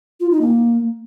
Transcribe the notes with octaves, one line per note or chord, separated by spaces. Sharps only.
F4
D#4
A#3